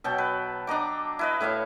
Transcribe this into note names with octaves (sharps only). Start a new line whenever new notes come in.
B2 F#3 G5 A5
B4
D4 D#5 A#5 D6
E4 B4 D#5
A2 C#5 E5 F5